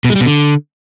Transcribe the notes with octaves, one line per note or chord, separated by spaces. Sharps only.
B2
G#3
G3
B2
D3